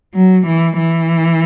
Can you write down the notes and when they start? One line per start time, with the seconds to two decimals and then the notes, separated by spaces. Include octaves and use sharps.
0.14 F#3
0.46 E3
0.77 E3